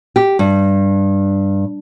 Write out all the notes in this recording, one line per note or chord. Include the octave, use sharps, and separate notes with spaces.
G4
G2